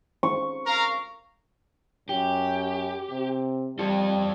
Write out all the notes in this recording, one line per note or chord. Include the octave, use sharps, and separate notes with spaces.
C#6
A#4 F5 A#5
F#2 G4
C3
G3 F4 A4